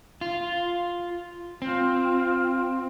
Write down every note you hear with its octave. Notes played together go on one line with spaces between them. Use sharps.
F4
C4 F4